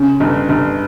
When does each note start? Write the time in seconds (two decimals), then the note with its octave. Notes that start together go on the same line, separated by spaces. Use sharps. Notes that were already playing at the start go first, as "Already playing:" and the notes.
Already playing: C#3
0.20 G1
0.49 G1